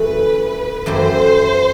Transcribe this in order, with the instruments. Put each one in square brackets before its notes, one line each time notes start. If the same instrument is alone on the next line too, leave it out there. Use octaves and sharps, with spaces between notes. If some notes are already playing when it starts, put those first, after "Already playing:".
Already playing: [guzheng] F#2 E3 A3 [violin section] B4
[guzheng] F#2 E3 A3 E4 G4 [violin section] C5